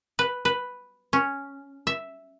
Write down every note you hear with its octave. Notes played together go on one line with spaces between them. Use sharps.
B4
B4
C#4
E5